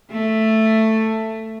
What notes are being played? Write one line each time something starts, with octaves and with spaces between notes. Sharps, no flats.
A3